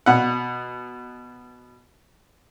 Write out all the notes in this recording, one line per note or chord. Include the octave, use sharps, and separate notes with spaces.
B2 F#5